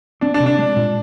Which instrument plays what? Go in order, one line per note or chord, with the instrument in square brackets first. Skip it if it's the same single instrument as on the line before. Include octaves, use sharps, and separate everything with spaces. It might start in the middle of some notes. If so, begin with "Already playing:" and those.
[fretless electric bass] C4 [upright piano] D4
[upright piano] D4
[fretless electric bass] C3
[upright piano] D4
[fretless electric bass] G#3
A#2